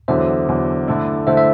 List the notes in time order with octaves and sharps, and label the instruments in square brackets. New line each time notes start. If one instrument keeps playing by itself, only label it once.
[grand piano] E2 D3 F#3 [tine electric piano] C5 E5
[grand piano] E2 D3 F#3
D3 A3 E4
[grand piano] D3 A3 E4 [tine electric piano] C5 E5
[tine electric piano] E5